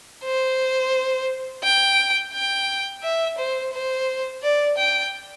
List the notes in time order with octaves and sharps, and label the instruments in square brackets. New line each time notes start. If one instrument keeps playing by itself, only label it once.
[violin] C5
G5
G5
E5
C5
C5
D5
G5